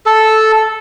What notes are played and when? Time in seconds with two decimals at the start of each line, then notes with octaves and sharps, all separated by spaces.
0.06 A4